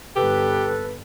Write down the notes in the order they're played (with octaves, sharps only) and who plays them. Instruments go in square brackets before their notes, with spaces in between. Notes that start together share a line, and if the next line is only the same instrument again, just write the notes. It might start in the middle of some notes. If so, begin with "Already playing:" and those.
[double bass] G1 [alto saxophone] G4 [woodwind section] A4 B4